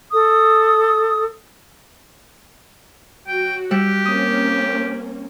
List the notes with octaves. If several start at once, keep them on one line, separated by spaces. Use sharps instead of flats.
A4 D#6
F#3 F#4 G5
G3 G4 E5 F#5
A#3 C4 C#4 D#6